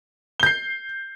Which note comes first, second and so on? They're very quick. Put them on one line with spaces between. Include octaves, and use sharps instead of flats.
G7 G6 C7